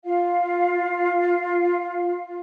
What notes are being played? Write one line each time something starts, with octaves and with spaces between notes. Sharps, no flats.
F4 F5